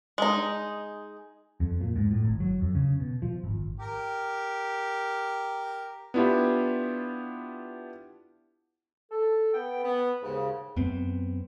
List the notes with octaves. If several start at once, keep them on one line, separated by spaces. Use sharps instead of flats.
G#3 D#4
F2
A#2
G#2
A2
G#1
F#3
F2
C#3
B2
F3
G#1
G4 A#4
B3 D4 E4 F4 G4
A4
B3 G5
B3
D#2 G#2 C#3
F#2 B3 C4